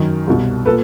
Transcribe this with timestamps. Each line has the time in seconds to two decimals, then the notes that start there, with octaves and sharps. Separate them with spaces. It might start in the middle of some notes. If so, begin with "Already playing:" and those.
Already playing: F#2 D#3
0.27 C2 B2
0.66 A#2 A4 B4